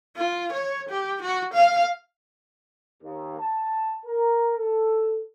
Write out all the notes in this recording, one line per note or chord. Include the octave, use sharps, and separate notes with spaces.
F4
C#5
G4
F#4
F5
D#2
A5
A#4
A4